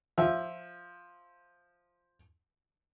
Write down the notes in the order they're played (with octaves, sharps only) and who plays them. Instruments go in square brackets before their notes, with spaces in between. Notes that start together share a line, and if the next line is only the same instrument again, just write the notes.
[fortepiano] F3 E5